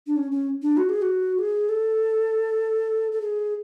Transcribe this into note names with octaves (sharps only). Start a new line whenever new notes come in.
D4
C#4
C#4
D4
F#4
G#4
F#4
G#4
A4
A4
G#4